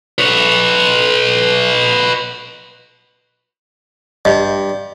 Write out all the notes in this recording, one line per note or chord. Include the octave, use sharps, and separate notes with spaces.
B4 C#5
G2 D#5